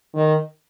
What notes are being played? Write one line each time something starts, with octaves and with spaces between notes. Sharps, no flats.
D#3